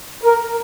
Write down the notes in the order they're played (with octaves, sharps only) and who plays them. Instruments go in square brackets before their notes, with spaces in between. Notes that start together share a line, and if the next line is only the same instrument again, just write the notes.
[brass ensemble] A#4